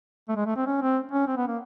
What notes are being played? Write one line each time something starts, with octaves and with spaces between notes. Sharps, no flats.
A3
G#3
A3
C4
C#4
C4
C#4
C4
B3
A#3